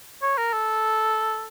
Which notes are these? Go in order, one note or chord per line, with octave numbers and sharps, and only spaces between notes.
C#5
A#4
A4